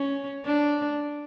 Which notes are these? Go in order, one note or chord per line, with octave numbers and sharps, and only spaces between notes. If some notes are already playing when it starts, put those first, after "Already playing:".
Already playing: C#4
D4